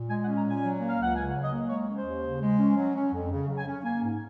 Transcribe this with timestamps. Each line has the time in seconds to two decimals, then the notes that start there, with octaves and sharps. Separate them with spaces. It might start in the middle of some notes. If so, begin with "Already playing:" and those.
Already playing: A#2
0.08 G#3 G#5
0.22 F#5
0.26 C#4
0.35 A#5
0.44 A#2 G#5
0.62 F#3
0.80 A#3
0.88 F5
0.98 C#2 F#5
1.16 C#3 G#5
1.34 F#3
1.42 D#5
1.51 A#3
1.69 G#3 C#5
1.87 C#4
1.96 C5
2.05 D#2
2.23 C#3
2.41 G#3
2.59 C#4
2.76 F#3
2.95 C#4
3.12 F2
3.31 C#3
3.48 F#3
3.57 G#5
3.66 C#4
3.84 A#3 G#5
4.02 G#2